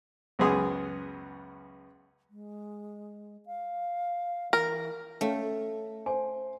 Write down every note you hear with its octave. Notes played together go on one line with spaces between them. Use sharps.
C#2 F#2 B3 G#4 C6 D#6
G#3
F5
E3 A#4
A3 C#4 C#5 F5
C5 G#5